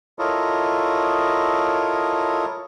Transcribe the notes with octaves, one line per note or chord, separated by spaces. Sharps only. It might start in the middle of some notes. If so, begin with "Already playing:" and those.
E4 F4 A4 A#4 C#5 D#5